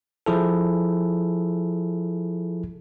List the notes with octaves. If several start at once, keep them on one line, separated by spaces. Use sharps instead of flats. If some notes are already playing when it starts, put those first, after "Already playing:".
F3 E4 G#4 A4